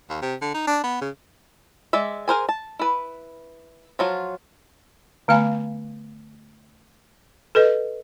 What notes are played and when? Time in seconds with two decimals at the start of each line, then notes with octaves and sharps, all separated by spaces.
0.10 D#2
0.22 C3
0.41 D3
0.54 D#4
0.67 D4
0.84 B3
1.01 C#3
1.93 G#3 D5 E5
2.28 G#4 A#4 C5 G#5
2.49 A5
2.79 E4 B4
3.99 F3 F#3 F4
5.28 D3 A3 B3 F5 G#5 B5
7.55 A4 B4 D#5